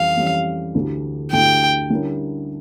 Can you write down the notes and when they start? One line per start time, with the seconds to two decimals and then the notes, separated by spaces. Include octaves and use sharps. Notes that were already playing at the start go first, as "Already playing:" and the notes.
Already playing: F2 E3 G3 C#4 F5
0.16 F2 E3 G3 C#4
0.75 D2 D3 A3 E4 G4
1.32 D2 D3 A3 E4 G4 G5
1.90 D3 G3 C#4 E4 A#4